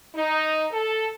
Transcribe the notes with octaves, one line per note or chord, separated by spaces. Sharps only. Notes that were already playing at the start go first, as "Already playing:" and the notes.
D#4
A4